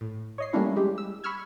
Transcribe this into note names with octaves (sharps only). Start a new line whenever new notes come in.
A2
C#5 D#5 C7
G3 A3 A#3 C#4 D4 E4
G3 G#3 G4
E6
B5 C#6 E6 F6 G#6